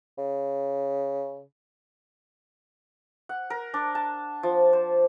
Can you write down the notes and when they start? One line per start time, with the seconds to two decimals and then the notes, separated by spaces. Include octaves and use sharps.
0.18 C#3
3.29 F#5
3.50 A#4
3.74 D4
3.95 A5
4.43 F3
4.73 C5